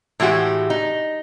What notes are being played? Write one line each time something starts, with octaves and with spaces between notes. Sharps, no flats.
A2 E3 G#3 F#4 G4
D#4